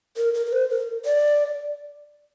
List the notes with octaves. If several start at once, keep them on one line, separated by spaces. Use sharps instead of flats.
A#4
A#4
A#4
C5
A#4
D5